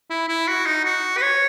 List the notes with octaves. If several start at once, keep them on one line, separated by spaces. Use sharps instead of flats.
E4
E4
F#4
D#4
F#4
B4
C#5